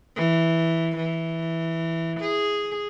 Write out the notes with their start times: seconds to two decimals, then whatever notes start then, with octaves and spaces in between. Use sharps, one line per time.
0.16 E3
0.96 E3
2.20 G#4